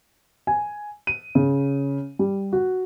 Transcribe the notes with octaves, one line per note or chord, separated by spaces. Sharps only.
G#5
D#7
C#3
G3
F#4